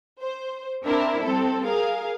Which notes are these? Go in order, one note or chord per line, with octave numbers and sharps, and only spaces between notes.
C5
C4 D4 E4 A#4
G3 C4 A4
G#4 A#4 F5